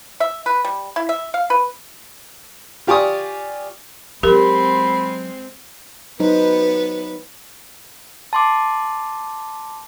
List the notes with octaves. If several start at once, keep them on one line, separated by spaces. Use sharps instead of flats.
E5
B4
G3
E4
E5
F5
B4
F4 G4 D5 G#5 C#6 D#6
F#3 G#3 C4 G4 A#4 B5 C6
F#3 B3 D#4 B4 C5
A5 C6 D6